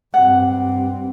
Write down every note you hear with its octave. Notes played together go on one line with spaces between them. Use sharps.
G2 C4 F#5